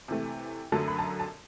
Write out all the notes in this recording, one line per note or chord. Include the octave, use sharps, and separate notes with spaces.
C3 E3 A3
F#2 D3 F#3 A3 A5
B5
A5
A#5
A5